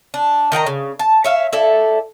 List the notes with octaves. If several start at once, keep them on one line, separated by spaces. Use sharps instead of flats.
D4
D#3 D#5 G5 A#5
C#3
A5
C#5 E5 F5
E4 A4 D5